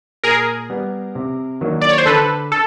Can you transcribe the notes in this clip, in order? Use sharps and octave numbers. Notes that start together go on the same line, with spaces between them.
A#2 G#4 A#4
G3 B3
C3
D#3 F#3 A#3 D4
D5
C#5
C5
D3 A4 B4
A4